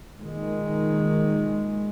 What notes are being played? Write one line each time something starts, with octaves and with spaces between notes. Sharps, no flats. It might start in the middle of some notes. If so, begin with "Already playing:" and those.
A#2 D#3 G#3